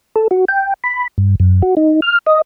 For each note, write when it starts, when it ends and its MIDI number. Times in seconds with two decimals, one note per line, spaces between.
0.16 0.28 69
0.31 0.45 66
0.48 0.74 79
0.84 1.07 83
1.18 1.35 43
1.40 1.62 42
1.62 1.75 66
1.77 2.00 63
2.02 2.18 89
2.27 2.41 75